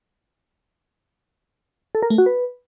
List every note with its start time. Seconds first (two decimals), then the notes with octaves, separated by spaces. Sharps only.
1.95 A4
2.03 A#4
2.10 A3
2.18 F#4
2.26 B4